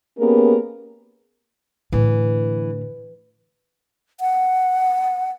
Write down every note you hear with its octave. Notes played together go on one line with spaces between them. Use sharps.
A#3 B3 C#4 G4 G#4 A#4
A2 D3 E3
F#5